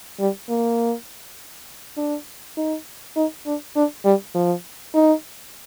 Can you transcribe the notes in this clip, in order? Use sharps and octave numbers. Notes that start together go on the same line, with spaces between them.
G3
A#3
D4
D#4
D#4
D4
D4
G3
F3
D#4